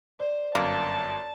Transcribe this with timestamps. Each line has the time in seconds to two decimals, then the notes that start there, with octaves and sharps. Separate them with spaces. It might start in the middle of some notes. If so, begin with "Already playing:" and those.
0.20 C5 D5
0.55 G1 F#2 A#3 A5